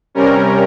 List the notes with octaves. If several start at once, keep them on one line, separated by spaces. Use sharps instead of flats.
C3 G3 C#4 A#4